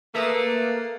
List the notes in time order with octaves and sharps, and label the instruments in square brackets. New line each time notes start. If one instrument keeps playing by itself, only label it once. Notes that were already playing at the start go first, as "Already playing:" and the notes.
[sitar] A3 [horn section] A#3 [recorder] B4 [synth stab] E5 A#5 D#6